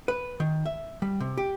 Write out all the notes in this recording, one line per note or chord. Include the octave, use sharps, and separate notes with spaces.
B4
D#3
E5
G3
C3
G4